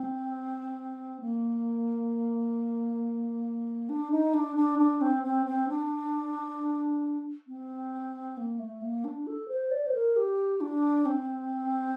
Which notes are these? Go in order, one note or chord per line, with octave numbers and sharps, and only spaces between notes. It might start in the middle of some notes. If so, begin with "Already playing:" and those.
Already playing: C4
A#3
D4
D#4
D4
D4
D4
C4
C4
C4
D4
C4
A#3
A3
A#3
D4
A4
C5
D5
C5
A#4
G4
D4
C4